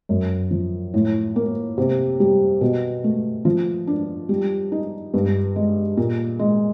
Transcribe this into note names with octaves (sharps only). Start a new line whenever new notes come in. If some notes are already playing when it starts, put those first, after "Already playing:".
F#2
F3
A2
A#3
C3
G3
B2
A3
F3
D4
G3
D#4
G2
G#3
A#2
G#3